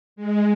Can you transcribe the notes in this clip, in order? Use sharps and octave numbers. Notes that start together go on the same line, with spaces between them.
G#3